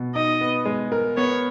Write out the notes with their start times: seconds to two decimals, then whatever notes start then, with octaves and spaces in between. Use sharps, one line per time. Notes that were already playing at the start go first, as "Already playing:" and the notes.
Already playing: B2
0.15 D#4 D#5
0.41 B3
0.65 G#3
0.92 A#4
1.17 B3 C#5